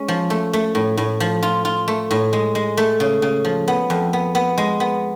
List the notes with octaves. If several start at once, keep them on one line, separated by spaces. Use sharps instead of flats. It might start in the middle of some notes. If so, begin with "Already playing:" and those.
Already playing: G#3 C#4
F3
A3
A3
A2
A2
F3
F4
F4
A3
A2
G#3
G#3
A3
C#3
C#3
F3
B3
F2
B3
B3
G#3
B3